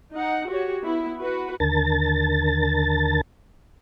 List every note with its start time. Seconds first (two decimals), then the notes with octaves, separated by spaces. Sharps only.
0.12 D#4 F#5
0.49 F#4 G4 C#5
0.84 B3 E4
1.19 F#4 B4
1.60 D#2 D3 A#4 A5 A6